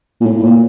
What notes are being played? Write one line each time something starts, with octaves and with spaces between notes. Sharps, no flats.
A#2
A2
A#2